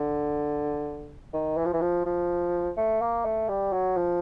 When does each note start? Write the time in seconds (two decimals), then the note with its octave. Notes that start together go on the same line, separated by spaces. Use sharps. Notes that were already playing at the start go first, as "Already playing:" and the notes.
Already playing: D3
1.33 D#3
1.57 E3
1.65 F3
1.73 E3
1.81 F3
2.05 F3
2.77 A3
3.01 A#3
3.25 A3
3.49 G3
3.72 F#3
3.96 F3